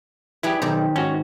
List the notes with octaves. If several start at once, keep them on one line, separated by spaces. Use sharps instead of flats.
G3 E4 G4 G#4 B4
B1 D#3 C4 G4
G#2 C#4 F#4